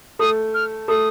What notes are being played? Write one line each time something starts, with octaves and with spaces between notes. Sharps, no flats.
A3 D#6
F6
A3 D#6